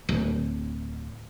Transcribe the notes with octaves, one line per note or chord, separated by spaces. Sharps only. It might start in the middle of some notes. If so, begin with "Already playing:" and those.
D1